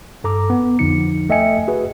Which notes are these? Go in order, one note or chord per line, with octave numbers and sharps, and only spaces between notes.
G2 A4 A#5 D6
B3
A#1 F2 D3 F3 D#4 C#7
A3 D#5 E5 G5 G#5 C#7
F#4 G#4 B4